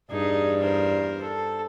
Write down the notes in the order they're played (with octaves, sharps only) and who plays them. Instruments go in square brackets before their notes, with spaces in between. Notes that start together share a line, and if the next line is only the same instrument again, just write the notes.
[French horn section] E2 D5 [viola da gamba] G2 [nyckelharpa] D#4 G#4
[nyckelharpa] A#4 C5
A4